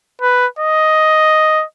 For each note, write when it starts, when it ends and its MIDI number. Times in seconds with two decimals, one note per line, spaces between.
0.22 0.46 71
0.59 1.64 75